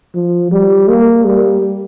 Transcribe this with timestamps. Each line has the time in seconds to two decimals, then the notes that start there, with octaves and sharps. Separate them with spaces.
0.15 F3
0.52 G3
0.88 A#3
1.25 G3